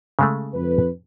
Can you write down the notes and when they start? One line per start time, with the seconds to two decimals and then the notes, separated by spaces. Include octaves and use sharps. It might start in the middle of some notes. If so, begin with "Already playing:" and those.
0.19 C#3 G#3 A3
0.53 F2 B4